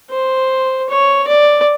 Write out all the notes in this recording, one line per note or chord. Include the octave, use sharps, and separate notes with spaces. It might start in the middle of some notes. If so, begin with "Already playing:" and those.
C5
C#5
D5